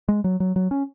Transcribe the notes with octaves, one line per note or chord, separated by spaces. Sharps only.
G#3
F#3
F#3
F#3
C#4